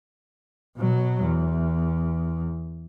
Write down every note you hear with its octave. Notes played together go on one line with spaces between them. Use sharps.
B2 F#3
E2